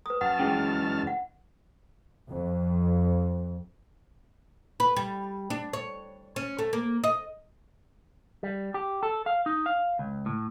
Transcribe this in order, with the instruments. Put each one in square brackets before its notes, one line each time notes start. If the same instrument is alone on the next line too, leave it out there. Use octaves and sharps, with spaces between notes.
[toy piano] B4 D#6
[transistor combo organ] F#2 A5 F6 [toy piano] F#5
[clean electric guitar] C#3 E3 G#3 [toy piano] G5
[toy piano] F#5
[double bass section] F2
[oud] B4
G3
D4
C#5
C#4
A3
A#3
D#5
[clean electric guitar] G3
G4
A4
F5
D#4
F5
C#2
A2